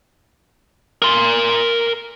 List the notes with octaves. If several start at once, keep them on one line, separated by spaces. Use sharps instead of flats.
A#4 C6